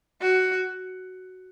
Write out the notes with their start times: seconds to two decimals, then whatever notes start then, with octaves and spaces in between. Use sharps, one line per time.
0.22 F#4